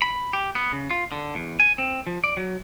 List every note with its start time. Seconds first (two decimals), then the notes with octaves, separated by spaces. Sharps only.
0.02 B5
0.33 G4
0.55 B3
0.73 C#3
0.90 F4
1.12 D3
1.35 E2
1.60 G#5
1.78 C4
2.07 F3
2.24 D5
2.37 F#3